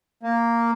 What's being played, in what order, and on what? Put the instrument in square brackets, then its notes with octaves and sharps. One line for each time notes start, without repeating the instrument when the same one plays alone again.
[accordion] A#3